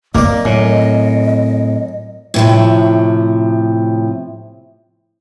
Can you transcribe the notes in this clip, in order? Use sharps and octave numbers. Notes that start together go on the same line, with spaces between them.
A#3 C4 D5 D#5
F#2 A2
A2 C3 F3